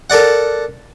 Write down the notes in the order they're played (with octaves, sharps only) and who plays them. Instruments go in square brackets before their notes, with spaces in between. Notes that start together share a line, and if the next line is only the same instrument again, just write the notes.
[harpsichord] A4 A#4 D5 F#5